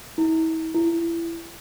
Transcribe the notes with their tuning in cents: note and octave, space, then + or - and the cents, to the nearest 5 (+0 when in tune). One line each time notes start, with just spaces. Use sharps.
E4 -40
E4 +25